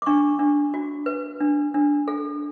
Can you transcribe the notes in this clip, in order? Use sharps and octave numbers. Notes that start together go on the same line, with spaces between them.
D6
D4 C#6
D4
F#4
B4
D4
D4
A4